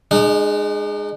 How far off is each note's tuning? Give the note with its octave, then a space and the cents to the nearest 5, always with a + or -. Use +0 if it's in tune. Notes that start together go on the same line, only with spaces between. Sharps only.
G#3 +0 D#4 -45